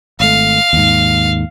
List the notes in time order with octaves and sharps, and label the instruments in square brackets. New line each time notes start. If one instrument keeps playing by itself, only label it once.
[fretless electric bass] G#1 A3 [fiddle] F5
[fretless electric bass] D#2 G#2